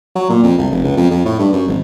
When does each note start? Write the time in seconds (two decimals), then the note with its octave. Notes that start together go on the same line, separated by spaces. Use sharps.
0.15 F#3
0.29 A#2
0.43 F2
0.58 C2
0.70 F1
0.84 C#2
0.97 F2
1.11 F2
1.25 A2
1.39 G2
1.52 F#2
1.68 G#1